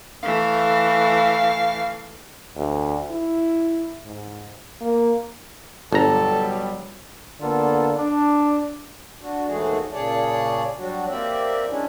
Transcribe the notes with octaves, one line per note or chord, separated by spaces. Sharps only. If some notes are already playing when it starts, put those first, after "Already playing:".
E3 A3 F5
D2
E4
G#2
A#3
G1 B2 F#3 G3 A4 A#5
D3 A#3 B3 F4 A4
D4
D4 F#4
D#2 E3 G#3 A3 F#4 G#4
A#2 C#3 G#4 C#5 D5 A5
F#3 G3 D4 F#4
A#3 C4 G4 D5 E5
G#3 C#4 D4 E4